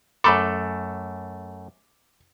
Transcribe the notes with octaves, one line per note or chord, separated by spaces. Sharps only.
F#2 A3 A4 A#5 B5 D6